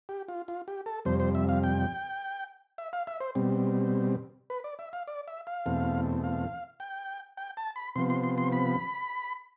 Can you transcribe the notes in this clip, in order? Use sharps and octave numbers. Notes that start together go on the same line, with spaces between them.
G4
F4
F4
G4
A4
F2 C3 G3 C5
C5
E5
F5
G5
E5
F5
E5
C5
B2 G3 C4
B4
D5
E5
F5
D5
E5
F5
E2 B2 A3 C4
F5
G5
G5
A5
B5
C3 F3 B3 C6
C6
C6
C6
B5